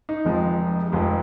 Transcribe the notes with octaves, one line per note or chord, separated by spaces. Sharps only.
D#4
F1 F2 F3 G#3
F1 F2 F3 G#3